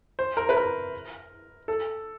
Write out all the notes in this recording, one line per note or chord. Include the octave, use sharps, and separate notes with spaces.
C5
A#4
B4
A#4
A4